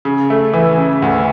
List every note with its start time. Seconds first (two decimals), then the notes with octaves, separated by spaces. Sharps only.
0.05 C#3
0.30 A3
0.53 E3
0.78 C#3
1.02 D2